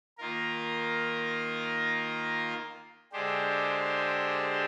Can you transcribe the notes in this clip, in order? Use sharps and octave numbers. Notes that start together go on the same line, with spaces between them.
D#3 A#3 F4 A#4
D3 G#3 D4 G4 C5